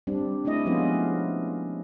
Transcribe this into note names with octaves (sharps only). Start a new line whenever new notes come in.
G3 C4 D4
A3 C4 D4 E4 D#5
F3 G#3 B3 C#4 E4 F4